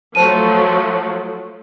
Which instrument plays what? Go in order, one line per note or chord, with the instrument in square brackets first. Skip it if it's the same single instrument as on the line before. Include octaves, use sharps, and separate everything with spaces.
[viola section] F3 F#3 A3 [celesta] C5 A5 D#7